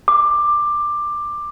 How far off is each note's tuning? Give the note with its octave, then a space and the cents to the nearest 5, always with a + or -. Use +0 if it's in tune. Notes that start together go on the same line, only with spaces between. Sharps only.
D6 +15